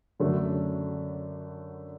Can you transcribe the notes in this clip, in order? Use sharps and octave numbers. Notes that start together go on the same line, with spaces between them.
F#2 D3 F#3 A3 D4